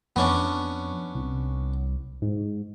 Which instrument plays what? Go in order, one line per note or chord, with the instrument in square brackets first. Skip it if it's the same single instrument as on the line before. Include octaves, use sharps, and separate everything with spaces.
[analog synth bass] F2 [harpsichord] B3 C#4 D4
[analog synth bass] C2
G#2